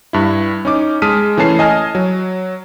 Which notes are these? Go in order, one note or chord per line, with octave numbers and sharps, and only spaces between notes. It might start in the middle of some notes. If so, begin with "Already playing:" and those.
G2 E4
C#4 D#4 D6
G#3 A5 D#6 F6 B6 D#7
E3 A3 C#4 A5 C7
D#5 G#5 A5 F6
F#3